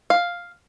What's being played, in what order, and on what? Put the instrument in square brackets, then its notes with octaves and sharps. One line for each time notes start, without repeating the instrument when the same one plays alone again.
[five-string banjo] F5